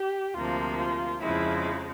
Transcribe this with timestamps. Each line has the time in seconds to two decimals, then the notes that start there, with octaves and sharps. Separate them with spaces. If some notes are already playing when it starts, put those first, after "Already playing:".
Already playing: G4
0.35 D2 C3 F3 A#3 F4
0.78 F4
1.21 F2 C#3 F3 G#3 E4